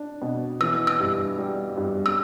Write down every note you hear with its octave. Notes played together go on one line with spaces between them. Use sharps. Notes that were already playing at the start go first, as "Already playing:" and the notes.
Already playing: D4
B2
E3 E6
E6
G2
G3
G2
E6